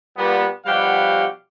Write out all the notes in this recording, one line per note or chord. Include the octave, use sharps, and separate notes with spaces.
A#2 G3 A#3 B3
B2 F3 G3 G4 F5 F#5